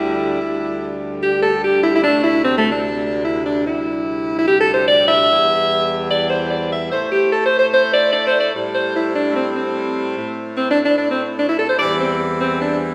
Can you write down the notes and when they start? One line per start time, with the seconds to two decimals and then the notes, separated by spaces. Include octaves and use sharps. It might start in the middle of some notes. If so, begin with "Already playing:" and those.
Already playing: D2 D3 G3 E4
0.41 D2 D3 G3
1.23 G4
1.42 A4
1.63 G4
1.84 E4
1.96 E4
2.04 D2 C3 A3 D4
2.24 E4
2.45 C4
2.58 A3
2.72 D4
3.25 E4
3.46 D4
3.66 D2 C3 G3 E4
4.39 E4
4.48 G4
4.61 A4
4.74 C5
4.88 D5
5.08 E5
5.29 E2 E3 G3
6.10 D5
6.30 C5
6.51 D5
6.72 E5
6.91 A2 A3 C5
7.12 G4
7.33 A4
7.46 C5
7.59 C5
7.73 C5
7.94 D5
8.13 D5
8.27 C5
8.41 D5
8.55 A2 G3
8.75 C5
8.96 E4
9.16 D4
9.31 A3
9.36 C4
9.56 C4
10.17 A2 A3
10.57 C4
10.71 D4
10.85 D4
10.98 D4
11.11 C4
11.40 D4
11.49 E4
11.59 A4
11.70 C5
11.79 E2 E3 G3 D5
12.00 C4
12.41 C4
12.61 D4